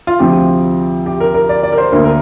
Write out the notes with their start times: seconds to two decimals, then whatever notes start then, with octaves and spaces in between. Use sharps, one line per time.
0.07 F4
0.19 D2 C3 F3 C4 G4
1.06 G4
1.20 A#4
1.34 A#4
1.49 D5
1.63 D5
1.72 A#4
1.78 C5
1.92 D2 D3 A#3 A#4
2.05 A#4